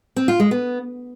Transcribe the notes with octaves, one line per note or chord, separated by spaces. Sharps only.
C4
F4
G#3
B3